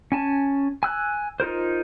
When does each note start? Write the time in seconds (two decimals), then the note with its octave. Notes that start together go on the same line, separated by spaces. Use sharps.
0.12 C#4 G#5 A5
0.83 G#5 E6 F#6
1.40 D#4 F4 A#4 C5